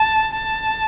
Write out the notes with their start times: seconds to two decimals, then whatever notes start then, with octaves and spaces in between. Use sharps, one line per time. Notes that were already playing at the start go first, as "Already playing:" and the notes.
Already playing: A5
0.33 A5